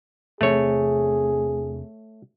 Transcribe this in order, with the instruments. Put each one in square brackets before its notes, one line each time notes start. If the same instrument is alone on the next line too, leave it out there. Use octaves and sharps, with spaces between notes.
[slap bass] E2 C3 C4 [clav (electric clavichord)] A3 C#5 [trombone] G#4